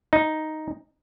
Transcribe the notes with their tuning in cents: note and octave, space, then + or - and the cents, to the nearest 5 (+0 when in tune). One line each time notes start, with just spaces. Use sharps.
D#4 +0